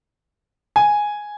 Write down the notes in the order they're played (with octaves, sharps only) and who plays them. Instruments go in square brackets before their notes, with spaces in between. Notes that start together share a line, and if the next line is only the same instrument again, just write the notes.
[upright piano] G#5